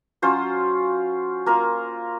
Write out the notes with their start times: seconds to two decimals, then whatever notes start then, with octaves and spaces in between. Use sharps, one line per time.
0.22 F#3 C#4 F4 C5
1.46 A#3 F4 A#4